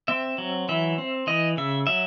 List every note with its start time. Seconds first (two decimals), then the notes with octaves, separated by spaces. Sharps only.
0.08 C4 E5
0.38 F#3
0.69 E3 E5
0.98 C4
1.27 E3 D#5
1.57 C#3 E5
1.87 F#3 E5